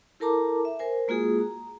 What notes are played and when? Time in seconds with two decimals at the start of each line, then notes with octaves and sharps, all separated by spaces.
0.20 E4 A4 A#4 A5 A#5 D6
0.65 E5
0.79 A#4 C5 G#5
1.08 G#3 A#3 F4 F#4 G#4 D#6
1.39 A#5